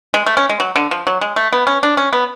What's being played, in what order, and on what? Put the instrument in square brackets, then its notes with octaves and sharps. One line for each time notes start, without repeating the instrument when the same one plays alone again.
[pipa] G#3
A3
C#4
G#3
F#3
D3
F3
F#3
G#3
A3
B3
C#4
D4
C#4
B3